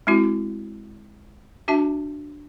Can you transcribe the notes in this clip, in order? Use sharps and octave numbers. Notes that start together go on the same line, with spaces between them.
G#3 C4 E4 F#4
D4 F#4 E5 A5